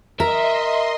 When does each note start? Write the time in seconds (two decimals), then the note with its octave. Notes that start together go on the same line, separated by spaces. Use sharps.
0.20 A#4 D#5 E5 C6